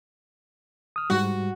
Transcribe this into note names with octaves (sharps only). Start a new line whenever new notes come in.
D#6 F6
G#2 G3 F#4